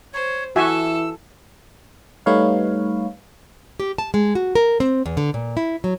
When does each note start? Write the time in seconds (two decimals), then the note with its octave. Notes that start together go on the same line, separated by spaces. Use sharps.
0.14 C5 C#5
0.56 E3 F#4 A4 E5 G#5 E6
2.26 G3 A3 D#4 B4 C#5 F5
3.80 G4
3.98 A5
4.14 G#3
4.35 F#4
4.55 A#4
4.80 C4
5.06 E2
5.17 D3
5.34 A#2
5.57 E4
5.84 F#3